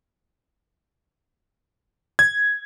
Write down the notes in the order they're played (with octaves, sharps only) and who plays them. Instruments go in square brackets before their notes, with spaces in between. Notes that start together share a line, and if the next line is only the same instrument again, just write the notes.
[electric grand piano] G#6